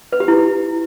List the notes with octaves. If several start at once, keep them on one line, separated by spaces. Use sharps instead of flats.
B4
G4
E4